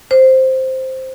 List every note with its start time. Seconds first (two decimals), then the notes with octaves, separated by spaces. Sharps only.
0.11 C5